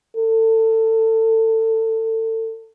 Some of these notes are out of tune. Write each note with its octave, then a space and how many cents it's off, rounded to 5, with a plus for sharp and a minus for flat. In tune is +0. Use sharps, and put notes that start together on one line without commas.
A4 +25